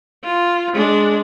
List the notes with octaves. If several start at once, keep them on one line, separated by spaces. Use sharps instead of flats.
F4
G#3 D4